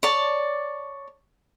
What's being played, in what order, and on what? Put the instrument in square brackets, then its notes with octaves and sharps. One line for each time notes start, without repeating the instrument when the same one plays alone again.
[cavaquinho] C#5 D5 A5